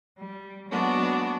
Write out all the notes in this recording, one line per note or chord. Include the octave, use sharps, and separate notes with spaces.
G3
F#3 G#3 A#3 B3 D4 F#4